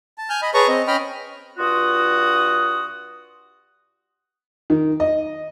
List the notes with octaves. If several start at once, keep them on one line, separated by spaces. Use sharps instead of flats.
A5
G#5 F6 G6
D#5 B5
G#4 B4 C#5 A5 A#5 C#6
C4 D#5
C#4 D#5 G5 B5 F6
G2 F4 F#4 D#6
D#3
D#5